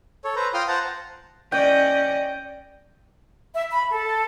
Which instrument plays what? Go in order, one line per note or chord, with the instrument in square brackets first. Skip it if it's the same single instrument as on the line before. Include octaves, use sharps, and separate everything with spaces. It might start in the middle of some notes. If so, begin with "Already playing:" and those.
[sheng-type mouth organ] A4 C#5
B4 C5 A#5
F4 G5 C6 D#6 F6
C5 F#5 A5 A#5
[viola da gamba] C#4 D5 D#5 [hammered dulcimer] G5
[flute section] E5
B5
A4